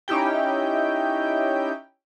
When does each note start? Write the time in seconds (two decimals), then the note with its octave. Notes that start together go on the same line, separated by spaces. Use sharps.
0.08 C#4 D#4 E4 G4 G5